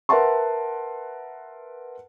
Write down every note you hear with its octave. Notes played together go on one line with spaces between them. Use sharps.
A#4 B4 E5 F#5 A5 C6